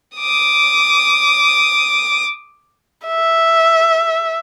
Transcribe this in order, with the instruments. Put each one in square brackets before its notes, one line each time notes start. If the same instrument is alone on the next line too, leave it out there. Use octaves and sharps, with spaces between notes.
[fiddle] D6 D#6
[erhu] E5